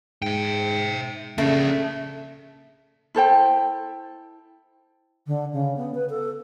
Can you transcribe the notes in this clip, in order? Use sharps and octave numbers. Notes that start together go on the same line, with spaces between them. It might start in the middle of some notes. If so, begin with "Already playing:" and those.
G#2 E5 G5
C#3 A3 A#3 D4
E4 A4 C5 G5
D3
C#3
B3
B4
A4